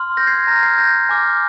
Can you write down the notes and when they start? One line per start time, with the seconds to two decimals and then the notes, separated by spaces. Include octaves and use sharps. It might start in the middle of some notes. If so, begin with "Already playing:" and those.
Already playing: C6 F6
0.17 G6 A#6
0.27 G#6 C7
0.38 G#6
0.47 A#5 F6 G6 A#6
0.63 G#6 C7
0.78 G6 A#6
1.09 G#5 D6 F6